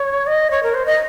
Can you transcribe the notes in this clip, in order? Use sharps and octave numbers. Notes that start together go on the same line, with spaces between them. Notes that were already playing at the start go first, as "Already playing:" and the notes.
Already playing: C#5
D#5
C#5
A#4
C5
D#5